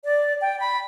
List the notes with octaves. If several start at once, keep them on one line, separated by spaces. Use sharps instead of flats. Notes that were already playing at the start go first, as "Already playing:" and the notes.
D5
G5
B5